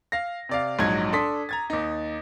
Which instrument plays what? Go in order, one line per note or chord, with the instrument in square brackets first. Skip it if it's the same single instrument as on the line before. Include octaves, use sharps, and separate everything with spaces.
[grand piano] F5 A#6
C3 D5 F5
A#1 G#2 F#3 D#4 G#6
D4 A4 C6 D#6 B6
A#5 G#6 A6
D#2 D#4